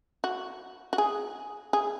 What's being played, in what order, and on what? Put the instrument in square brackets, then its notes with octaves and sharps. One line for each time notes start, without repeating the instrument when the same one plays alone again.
[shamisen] F#4
F#4
G#4
G#4